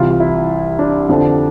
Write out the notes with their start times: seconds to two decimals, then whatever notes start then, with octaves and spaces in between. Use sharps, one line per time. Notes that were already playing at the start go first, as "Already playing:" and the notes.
Already playing: C2 C3 E3 F4
0.11 F4
0.20 E4
0.79 D4
1.09 F2 D3 F3